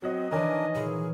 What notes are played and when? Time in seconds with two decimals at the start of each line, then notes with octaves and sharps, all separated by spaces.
0.02 F#3 C4 F#4 D#5
0.31 D#3 E3 D4 A#4 C#5 D#5 G#5
0.75 A#2 E3 G#4